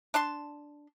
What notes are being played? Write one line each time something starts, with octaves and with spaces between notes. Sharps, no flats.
D4 A5 C6